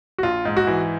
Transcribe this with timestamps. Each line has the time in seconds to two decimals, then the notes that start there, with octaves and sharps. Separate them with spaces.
0.18 F#4
0.23 A#1 F4
0.45 G#2
0.57 F#4
0.67 E3